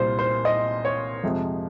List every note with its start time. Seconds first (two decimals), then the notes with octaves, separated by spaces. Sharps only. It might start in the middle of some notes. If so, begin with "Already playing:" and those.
Already playing: C2 A#2 G3 A#3 C5
0.19 C5
0.45 D#5
0.85 C#5
1.23 F2 C3 F3 G#3